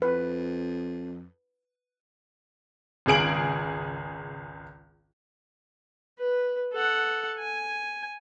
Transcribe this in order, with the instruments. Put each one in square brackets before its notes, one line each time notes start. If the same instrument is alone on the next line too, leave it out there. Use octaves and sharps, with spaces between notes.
[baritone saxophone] F2 [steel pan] B4
[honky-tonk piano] G#1 C#2 G#4 D7 F#7
[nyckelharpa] B4
A4 F#5
G#5